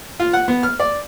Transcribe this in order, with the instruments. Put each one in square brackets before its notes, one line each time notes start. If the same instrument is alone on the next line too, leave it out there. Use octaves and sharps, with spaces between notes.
[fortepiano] F4
F#5
B3
F6
D5